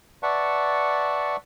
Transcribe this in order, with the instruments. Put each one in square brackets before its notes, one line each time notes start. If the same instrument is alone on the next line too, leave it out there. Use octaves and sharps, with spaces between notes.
[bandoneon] B4 D5 E5 F#5 A5 C#6